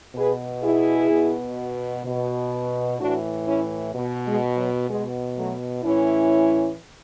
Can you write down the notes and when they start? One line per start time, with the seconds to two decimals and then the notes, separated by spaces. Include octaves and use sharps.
0.16 B2 G#4 B4
0.63 E4 G#4
1.10 B2
2.05 B2
2.99 A2 E3 D4 F#4
3.47 C#4 E4
3.94 B2
4.27 G#3
4.57 F#3
4.89 B2 G#3
5.37 F#3 A3
5.83 A2 E3 C#4 E4